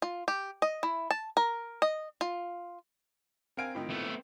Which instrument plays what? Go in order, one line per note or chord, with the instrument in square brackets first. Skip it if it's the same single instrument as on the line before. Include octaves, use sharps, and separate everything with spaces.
[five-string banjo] F4
G4
D#5
E4
A5
A#4
D#5
F4
[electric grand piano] C4 D7 [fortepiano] A#4 F5 G#5
[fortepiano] A2 D#3 F3
[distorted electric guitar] A3 B3